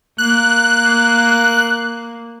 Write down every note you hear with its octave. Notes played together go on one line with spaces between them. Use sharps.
A#3 F#6